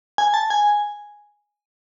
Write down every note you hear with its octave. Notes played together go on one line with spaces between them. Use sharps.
G#5
A5
G#5